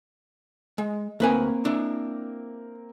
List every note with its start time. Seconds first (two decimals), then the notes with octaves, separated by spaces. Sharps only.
0.78 G#3
1.20 D2 A#3 C4 A#4 B4 G#5
1.65 D4 E4